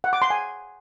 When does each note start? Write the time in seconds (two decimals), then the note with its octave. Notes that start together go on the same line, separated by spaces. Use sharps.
0.04 F#5
0.13 D6
0.22 C6
0.30 G#5